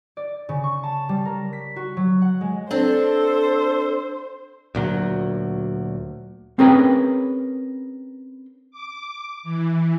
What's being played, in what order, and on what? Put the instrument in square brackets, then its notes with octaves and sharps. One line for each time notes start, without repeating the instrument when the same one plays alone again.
[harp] D5
C#3
C#6
A5
G3
A#4
B6
F#4
F#3
F#5
G#3
[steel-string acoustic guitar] C4 D4 [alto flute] A4 [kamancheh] C5
[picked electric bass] D2 A#2 F#3
[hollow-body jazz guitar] C4 C#4 G#4 A#4 B4 G5
[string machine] D6
E3